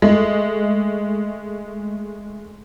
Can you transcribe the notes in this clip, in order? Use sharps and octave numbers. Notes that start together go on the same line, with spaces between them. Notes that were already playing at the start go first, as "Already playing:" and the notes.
G#3 A3